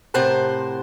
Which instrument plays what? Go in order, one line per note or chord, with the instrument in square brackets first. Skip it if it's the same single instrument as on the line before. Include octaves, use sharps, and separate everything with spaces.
[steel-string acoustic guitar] A2 C3 A#4 C5 F#5 A5